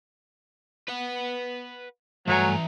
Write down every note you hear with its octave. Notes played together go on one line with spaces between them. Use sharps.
B4 F#5
G2 E3 F#3 A3 G#5 A#5